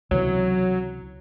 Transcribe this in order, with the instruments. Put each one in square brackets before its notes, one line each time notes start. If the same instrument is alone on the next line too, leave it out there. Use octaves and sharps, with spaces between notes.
[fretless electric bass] C#2 C3 E3 [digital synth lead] F#3